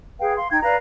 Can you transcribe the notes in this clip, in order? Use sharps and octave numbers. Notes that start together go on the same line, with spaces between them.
G#4 B4 F5 G5
F5 C6
D#4 G5 G#6
B4 D5 F5 A#5